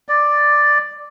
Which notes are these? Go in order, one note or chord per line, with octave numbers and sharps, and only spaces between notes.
D5